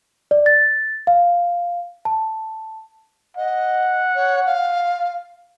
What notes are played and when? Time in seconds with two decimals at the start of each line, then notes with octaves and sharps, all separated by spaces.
0.31 D5
0.46 A6
1.07 F5
2.05 A5
3.37 D#5 F#5
4.15 C#5
4.46 F5